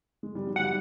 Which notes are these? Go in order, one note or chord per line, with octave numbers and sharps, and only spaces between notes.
G#3
G3
F#3
G3 F#5